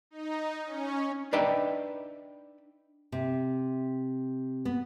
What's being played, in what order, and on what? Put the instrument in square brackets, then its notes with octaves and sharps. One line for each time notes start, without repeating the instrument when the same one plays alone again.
[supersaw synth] D#4
C#4
[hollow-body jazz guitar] D4 D#4 B4 D5 E5 G5
[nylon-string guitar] C3
B3